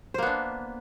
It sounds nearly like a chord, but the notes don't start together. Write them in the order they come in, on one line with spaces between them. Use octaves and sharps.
C5 A#3 B3 D4